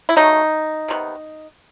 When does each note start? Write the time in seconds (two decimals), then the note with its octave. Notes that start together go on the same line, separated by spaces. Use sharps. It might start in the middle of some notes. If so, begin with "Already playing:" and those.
0.09 E4
0.16 C#3 F#3 A3 D#4
0.88 C3 D#3 G#3 B3